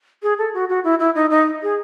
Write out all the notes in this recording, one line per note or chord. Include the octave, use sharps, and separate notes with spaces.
G#4
A4
F#4
F#4
E4
E4
D#4
D#4
G#4